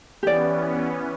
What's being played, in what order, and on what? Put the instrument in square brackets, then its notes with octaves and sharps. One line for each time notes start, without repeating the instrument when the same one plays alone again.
[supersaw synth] E3 B3 C#4 [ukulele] G4 D5